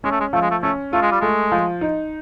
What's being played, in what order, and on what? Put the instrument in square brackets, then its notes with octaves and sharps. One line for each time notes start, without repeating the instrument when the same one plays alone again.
[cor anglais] G#3 [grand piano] C#4
[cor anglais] A3
G#3
[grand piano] F3 [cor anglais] A3
[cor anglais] G#3
A3
[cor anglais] A3 [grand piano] C#4
[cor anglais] A3 [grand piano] F4
[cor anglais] G#3
G3
[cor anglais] G#3 [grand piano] A3
[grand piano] F3
D#4